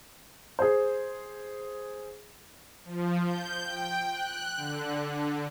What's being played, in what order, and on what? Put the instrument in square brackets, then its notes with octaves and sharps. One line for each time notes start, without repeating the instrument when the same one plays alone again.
[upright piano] G#4 C5
[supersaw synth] F3
G6
G5
F#6
D3